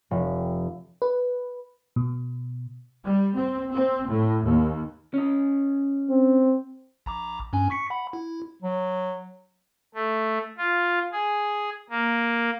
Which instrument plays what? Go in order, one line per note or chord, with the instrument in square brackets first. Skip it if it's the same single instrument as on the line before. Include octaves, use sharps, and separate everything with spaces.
[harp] F1
[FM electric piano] B4
B2
[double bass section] G3
C4
C4
A2
D#2
[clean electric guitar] C#4 D#5
[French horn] C4
[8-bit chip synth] A#1 A#5 D6
G2 C#4 G#5
C#6 B6 C#7
F#5 B5
E4
[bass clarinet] F#3
[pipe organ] A3
F4
G#4
A#3